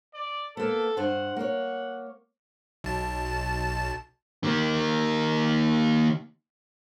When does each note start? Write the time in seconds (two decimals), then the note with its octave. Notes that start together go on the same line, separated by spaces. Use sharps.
0.14 D5
0.57 A#3 B3 A4
0.97 G2 C5 F#5
1.36 A#3 C#5 F#5
2.84 B1 A5
4.43 D#3 A#3